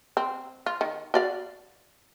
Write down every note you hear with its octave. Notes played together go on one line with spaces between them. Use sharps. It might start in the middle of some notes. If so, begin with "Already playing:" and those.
C4
F4
D#3
F#4 D5 F5